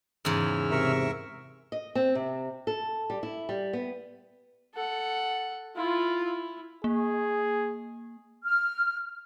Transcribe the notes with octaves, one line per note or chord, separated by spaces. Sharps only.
E2 G#2 C#3 E6 F6
C3 A#4 E5 C#6
D#5
C4
C3
A4
G3
E4
G3
B3
A4 F#5
E4 F4
E4
A#3 G#4
F6